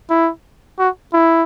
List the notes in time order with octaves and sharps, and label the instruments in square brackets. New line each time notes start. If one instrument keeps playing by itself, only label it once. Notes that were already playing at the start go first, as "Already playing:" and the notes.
[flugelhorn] E4
F#4
E4